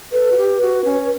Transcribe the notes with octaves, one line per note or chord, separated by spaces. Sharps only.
A4 B4
F#4
G4
F#4
C#4